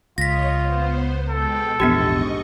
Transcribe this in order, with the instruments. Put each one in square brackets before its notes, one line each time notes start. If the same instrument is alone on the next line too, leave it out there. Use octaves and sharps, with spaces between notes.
[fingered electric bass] C#2 [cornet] F4 [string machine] C#5 D#5 [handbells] A#6 B6
[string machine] B3 C5
[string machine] B2 G#3 G5 [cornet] A4
[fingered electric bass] A#1 E2 [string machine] G#2 D#5 C#6 [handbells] B3 D4 G4